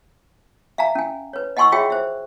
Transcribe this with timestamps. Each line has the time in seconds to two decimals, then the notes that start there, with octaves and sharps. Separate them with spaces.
0.78 E5 F5 G#5 A#5
0.95 C#4 G#5
1.33 B4 C#5
1.57 D#5 F#5 G#5 C6 C#6 E6
1.72 F4 F#4 G#4 C#5 E5 G5
1.90 C5 E5